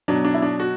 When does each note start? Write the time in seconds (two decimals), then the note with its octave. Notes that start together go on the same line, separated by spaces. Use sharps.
0.08 B2 F#3 D4
0.25 D4
0.34 E4
0.42 D4
0.60 F#4